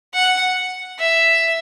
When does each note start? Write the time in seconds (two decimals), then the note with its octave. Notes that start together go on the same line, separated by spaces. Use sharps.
0.14 F#5
0.99 E5